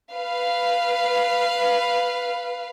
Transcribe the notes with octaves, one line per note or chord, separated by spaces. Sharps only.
B4 F5